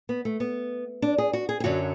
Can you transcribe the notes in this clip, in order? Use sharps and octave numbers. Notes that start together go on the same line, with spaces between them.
B3
A3
B3
D4
G#4
F#4
G#4
G#4
F#2 D3 F#3 F#4